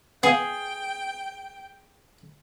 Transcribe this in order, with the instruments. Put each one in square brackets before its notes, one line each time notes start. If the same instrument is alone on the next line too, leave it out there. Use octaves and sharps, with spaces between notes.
[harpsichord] B3 F5 [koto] G#4 [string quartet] G5